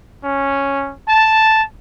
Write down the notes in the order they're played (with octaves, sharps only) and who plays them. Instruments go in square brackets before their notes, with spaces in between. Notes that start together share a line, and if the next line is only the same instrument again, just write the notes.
[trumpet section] C#4
A5